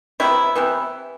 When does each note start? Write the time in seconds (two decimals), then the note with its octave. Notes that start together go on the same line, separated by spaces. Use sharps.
0.20 C3 F#3 B3 E4
0.55 C3 E3 B3